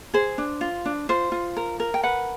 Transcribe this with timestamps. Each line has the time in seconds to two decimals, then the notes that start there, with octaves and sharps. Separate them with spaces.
0.14 G#4 C5
0.38 D4
0.61 F4
0.86 D4
1.09 F4 C5
1.32 F4
1.57 A#4
1.80 A#4
1.94 G5
2.03 B4 F#5